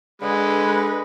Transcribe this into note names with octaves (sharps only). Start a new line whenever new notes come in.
D3 G#3 B4